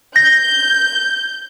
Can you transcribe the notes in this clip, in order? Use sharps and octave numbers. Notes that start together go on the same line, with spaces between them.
G6 A#6